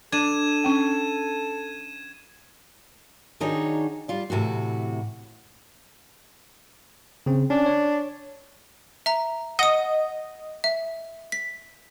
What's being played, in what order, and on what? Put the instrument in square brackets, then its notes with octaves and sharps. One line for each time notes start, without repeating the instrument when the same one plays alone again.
[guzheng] D4 [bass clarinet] A4 [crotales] G#6 D#7 E7
[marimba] C#4 G5
[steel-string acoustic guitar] D#3 D4 D#4 F#4 G#4 C#5
G3 F4 D5
A2 C3 E3 F#4
[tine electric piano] C#3 C4
[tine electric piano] C#4 [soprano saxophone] D4
[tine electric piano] C#5
[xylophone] E5 A#5
[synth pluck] D#5 [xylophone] F#5 D#6
[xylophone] E5
B6